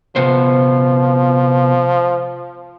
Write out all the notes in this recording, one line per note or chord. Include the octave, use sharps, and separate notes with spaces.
C3 F3 B3 C5